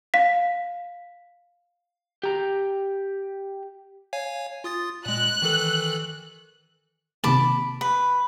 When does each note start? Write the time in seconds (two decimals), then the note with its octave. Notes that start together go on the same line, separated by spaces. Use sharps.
0.14 F5 B6
2.23 G4 A#5
4.13 C#5 F5 G#5
4.64 F4 D#6 A6
5.06 A#2 G#3 F#6
5.42 D#3 E3 A4
7.24 C3 D#3 A#3 A5 B5 D6
7.81 B4